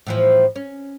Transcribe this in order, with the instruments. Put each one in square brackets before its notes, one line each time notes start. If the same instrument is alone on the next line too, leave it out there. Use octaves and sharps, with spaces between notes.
[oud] A2 E3 F3
C#4